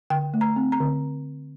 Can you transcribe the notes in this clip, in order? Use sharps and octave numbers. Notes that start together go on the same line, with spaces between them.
D3 G5
A3
A#5
C4
A#5
D3